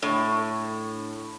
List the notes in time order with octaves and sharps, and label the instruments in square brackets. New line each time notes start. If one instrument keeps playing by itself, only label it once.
[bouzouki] A2 [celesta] D4 C#6